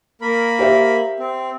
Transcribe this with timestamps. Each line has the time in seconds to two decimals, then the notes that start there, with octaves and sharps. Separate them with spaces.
0.21 A#3 A#4 B5
0.59 G4 C5 E5
1.20 C4